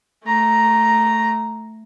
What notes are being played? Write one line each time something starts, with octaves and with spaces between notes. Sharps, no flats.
A3 A#5